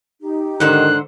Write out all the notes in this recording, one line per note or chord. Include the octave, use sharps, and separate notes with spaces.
D#4 G4
G#2 D3 D#3 C5 F#6